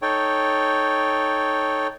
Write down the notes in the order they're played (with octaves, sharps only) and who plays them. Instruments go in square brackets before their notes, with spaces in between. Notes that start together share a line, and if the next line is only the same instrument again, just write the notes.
[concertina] D#4 A4 C#5 G5